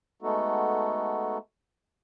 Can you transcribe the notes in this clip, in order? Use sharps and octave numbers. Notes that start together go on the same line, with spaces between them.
G#3 A3 B3 D#4 F#4 A4